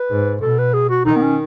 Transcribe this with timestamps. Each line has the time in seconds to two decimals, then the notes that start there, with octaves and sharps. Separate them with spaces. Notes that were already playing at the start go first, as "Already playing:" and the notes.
Already playing: B4
0.10 G#2
0.41 B2 A4
0.58 B4
0.73 G#4
0.89 F#4
1.05 D#3 D#4
1.16 B3
1.22 C#4